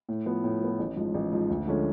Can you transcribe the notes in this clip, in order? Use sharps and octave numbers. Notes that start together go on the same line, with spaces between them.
A2
F3 B3
A2
F3 B3
A1
G#2 F3
A1
G#2 F3
D2
D3 F3 G#3 C#4